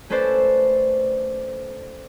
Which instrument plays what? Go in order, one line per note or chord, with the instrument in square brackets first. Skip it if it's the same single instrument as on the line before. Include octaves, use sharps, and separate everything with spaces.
[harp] A3 C#4 A4 B4 C5 D5